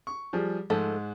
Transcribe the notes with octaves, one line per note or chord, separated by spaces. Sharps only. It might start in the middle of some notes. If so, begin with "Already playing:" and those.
C#6
F3 G3 G#4
G#2 F3 G#3 A3 A4